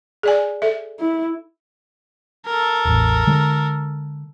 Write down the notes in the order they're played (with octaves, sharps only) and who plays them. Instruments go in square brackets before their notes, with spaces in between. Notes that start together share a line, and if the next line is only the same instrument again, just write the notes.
[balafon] G#4 D5 G#5
A4 E5
[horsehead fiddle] E4
[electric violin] A4 A#4
[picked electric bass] E1 A1
D3 G#3